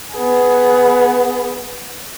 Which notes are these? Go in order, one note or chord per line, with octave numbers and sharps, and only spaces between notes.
B3 G#4